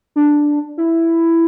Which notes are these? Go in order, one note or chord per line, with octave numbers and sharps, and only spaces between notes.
D4
E4